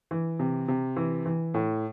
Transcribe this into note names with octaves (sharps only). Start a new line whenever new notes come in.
E3
C3
C3
E3
E3
A2